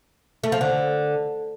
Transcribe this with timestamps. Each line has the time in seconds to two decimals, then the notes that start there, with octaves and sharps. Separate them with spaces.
0.44 A3
0.52 F3
0.61 D3